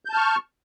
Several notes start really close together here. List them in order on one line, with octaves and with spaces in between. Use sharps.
G6 A5 F6 C#6